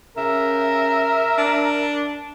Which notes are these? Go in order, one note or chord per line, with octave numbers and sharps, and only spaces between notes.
C#3 A#4 E5
D4